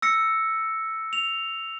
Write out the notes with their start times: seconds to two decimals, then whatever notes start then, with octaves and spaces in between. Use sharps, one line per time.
0.02 E6 A#6 C#7
1.13 F7